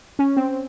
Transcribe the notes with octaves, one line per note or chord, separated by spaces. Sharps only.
C#4
C4